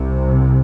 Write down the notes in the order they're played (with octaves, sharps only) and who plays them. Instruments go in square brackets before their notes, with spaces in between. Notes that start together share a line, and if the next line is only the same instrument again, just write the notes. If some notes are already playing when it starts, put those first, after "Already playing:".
Already playing: [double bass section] C2 C3